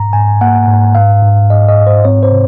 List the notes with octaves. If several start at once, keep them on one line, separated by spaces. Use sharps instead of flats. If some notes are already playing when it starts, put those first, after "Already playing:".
Already playing: G#2 A#5
G#2 G#5
A#3 F#5
G#2
G#2 F5
G#2
G#2 D#5
D#5
G#2
C5
C4 C#5
C5
C3